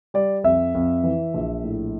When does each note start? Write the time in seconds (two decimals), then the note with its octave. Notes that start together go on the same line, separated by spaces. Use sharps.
0.14 G3 D5
0.44 F2 E5
0.75 F2
1.04 E3
1.34 A#1
1.64 A2